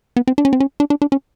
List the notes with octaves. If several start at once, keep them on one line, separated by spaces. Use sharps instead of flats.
B3
C4
D4
C#4
C4
C#4
D4
D4
D4
C#4